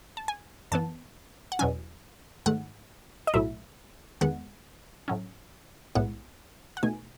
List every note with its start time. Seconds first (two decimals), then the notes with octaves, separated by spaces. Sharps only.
0.17 A5
0.28 G#5
0.72 F#2 E3 B3 A5
1.52 F#5
1.59 E2 B2 F#3 C#4 G#5
2.46 G#2 D#3 A3 F#5
3.27 D#5
3.34 B1 A2 F#3 A3 E4 E5
4.21 E2 D#3 G#3 B3 F#5
5.08 A2 F#3 C#4
5.95 B1 A2 G#3 B3 E4 F#5
6.77 F#5
6.83 B2 A3 D#4 G#5